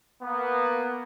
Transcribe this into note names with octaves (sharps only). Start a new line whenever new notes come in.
A#3 B3